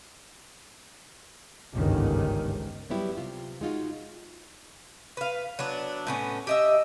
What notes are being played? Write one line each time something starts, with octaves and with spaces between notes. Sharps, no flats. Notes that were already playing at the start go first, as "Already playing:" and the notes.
G1 C#2 G#2 D#3
F#3 G3 B3 E4 G4
C3 F4
G#3 D#4 F4 F#4
B4 F5
F#3 B3 D4
A2 B3 C#4
G4 D#5 E5